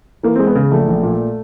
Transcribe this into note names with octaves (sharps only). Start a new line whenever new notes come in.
E3 A#3
C4
G#3
B3
C#3
A#1 A3
A#1
A#2